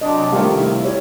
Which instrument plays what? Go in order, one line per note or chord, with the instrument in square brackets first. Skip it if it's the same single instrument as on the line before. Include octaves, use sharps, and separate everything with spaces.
[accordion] F#2 C3 D4 [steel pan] D#5
[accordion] C3 D#3 [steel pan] G3 D4 G4 [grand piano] A3 A#3 F4
[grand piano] E4
[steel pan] G4 C#5 D5